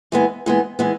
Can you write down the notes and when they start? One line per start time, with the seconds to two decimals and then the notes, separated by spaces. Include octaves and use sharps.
0.12 E3 G#3 B3
0.46 E3 G#3 B3
0.79 E3 G#3 B3